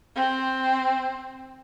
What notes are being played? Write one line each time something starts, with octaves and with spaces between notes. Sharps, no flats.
C4